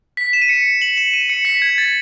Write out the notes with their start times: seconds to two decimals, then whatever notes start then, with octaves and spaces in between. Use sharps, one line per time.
0.17 B6
0.33 E7
0.42 D#7
0.49 C#7
0.82 F#7
0.97 E7
1.14 D#7
1.29 C#7
1.45 B6
1.62 G#6
1.78 A6